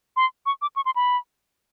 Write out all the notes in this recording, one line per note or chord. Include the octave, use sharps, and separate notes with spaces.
C6
C#6
D6
C#6
C6
B5